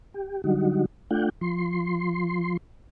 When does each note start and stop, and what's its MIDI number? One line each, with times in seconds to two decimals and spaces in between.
0.14 0.41 67
0.44 0.85 50
0.44 0.85 54
0.44 0.85 55
0.44 0.85 63
0.44 0.85 66
1.11 1.29 57
1.11 1.29 62
1.11 1.29 65
1.11 1.29 78
1.11 1.29 79
1.41 2.57 53
1.41 2.57 84